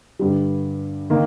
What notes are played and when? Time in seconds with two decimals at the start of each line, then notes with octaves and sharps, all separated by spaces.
0.19 G2 D3 G3
1.10 D#3 A#3